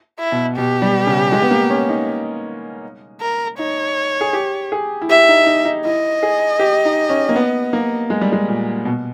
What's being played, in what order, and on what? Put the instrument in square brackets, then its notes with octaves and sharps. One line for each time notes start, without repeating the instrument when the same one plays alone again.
[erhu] E4
[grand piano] B2
[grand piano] B2 [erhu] G4
[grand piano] G3
C#3
G#3
B3
A#3
C#4
D#4
[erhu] A#4
[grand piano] D#4 [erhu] C#5
[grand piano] G#4
G4
G#4
E4
[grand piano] G4 [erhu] E5
[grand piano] D#4
D#4
D#4
[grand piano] E4 [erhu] D#5
[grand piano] G#4
G4
D#4
C#4
A#3
B3
A#3
G#3
G3
G#3
A#2
B2